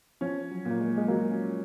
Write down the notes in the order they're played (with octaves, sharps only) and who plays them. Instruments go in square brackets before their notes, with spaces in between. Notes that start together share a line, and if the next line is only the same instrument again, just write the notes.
[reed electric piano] F3 [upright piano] C#4
[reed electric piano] F#3
[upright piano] A#2
[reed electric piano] A#3
G#3
G#3
[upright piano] F#3 [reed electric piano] A#3
[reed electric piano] C#4